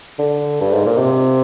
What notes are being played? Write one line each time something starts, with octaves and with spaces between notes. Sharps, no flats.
D3
G2
G#2
A#2
C3